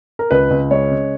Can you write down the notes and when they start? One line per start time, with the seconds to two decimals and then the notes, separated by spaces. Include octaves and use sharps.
0.19 A#4
0.31 C#2 B4
0.51 C#2
0.71 G#3 C#5
0.91 C#3